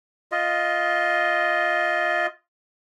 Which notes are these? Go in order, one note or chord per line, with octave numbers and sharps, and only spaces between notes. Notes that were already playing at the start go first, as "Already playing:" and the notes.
F4 D#5